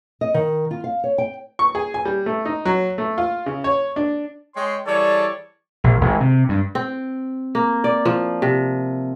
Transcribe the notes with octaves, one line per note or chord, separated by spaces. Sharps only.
D#5
D#3
F4
F5
C#5
G5
C#6
G#4
G#5
G3
A3
D#4
F#3
A3
F4
C#3
C#5
D4
G#3 C#5 G5 C6
E3 G3 G#4 A4 C#5 D5
A#1
G#1
C3
G2
C4
A#3
D5
F3
C3